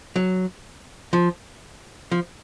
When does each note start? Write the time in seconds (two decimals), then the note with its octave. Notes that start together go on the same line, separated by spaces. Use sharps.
0.16 F#3
1.13 F3
2.12 F3